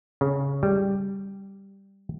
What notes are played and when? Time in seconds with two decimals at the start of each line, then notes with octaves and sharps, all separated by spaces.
0.21 C#3
0.63 G3